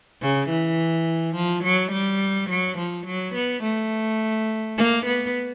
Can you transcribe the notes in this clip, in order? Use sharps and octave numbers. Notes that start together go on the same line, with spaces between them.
C#3
E3
F3
F#3
G3
F#3
F3
F#3
B3
A3
A#3
B3